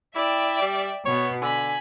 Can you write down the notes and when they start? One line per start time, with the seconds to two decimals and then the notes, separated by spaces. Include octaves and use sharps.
0.15 E4 D5 E5 G5
0.62 G3
1.06 B2 B3 C#5
1.42 D3 G#5 B5